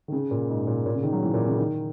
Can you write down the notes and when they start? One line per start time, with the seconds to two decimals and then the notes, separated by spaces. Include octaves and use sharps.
0.08 D#3
0.12 C#3
0.31 A#2
0.49 G#2
0.67 A#2
0.86 A#2
0.95 C#3
1.03 D#3
1.12 F#3
1.23 E3
1.34 A#2
1.47 C#3
1.58 D#3